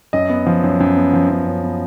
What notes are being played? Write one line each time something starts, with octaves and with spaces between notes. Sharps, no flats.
F#2 D#5
B3
F3
F#2
F#2
B3
F3
F#2
F#2
B3